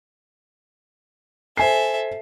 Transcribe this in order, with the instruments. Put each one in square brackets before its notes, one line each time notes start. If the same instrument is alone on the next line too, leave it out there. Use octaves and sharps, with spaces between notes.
[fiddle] A4 E5 [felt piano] C5 G#5 C7